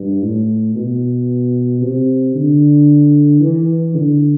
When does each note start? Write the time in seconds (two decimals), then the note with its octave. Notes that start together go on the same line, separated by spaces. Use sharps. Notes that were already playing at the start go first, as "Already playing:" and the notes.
Already playing: G2
0.22 A2
0.75 B2
1.82 C3
2.35 D3
3.40 E3
3.95 D3